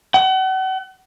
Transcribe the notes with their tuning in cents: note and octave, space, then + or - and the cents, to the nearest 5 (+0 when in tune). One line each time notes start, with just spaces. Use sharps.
F#5 +40